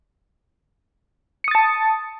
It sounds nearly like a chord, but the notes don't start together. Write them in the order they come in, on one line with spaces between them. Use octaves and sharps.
C#7 D#6 A6 A5